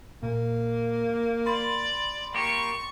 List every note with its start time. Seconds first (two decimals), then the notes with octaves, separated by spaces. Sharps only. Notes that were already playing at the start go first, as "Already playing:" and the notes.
0.23 A#2 A#3
1.46 D5 B5 C6 A6
2.34 A#3 G4 C#6